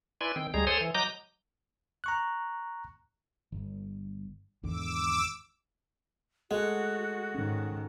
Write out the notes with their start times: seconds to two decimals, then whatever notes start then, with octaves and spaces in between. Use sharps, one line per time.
0.21 E4 B4 D5 G#5 C6
0.36 D#3 C4 G5
0.54 D2 G3 G#3 G#4 A#5
0.67 A4 C5 C#5 G#5 C6 D#6
0.81 E3
0.95 F#3 D#5 A#5 D6 G6
2.04 A#5 C#6 F#6
3.52 G1
4.63 G#1 E2 D3 D6 E6
6.51 G#3 F#4 A4 F#5
7.35 G#2 D#3 C#4